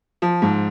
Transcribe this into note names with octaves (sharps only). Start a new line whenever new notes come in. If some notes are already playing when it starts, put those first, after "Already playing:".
F3
G#2